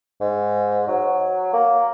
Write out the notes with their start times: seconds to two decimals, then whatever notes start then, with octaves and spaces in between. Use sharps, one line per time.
0.21 G#2
0.88 F#3
1.53 A#3